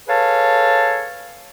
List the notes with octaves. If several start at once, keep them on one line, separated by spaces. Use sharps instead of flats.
G#4 A4 B4 C#5 F5 A5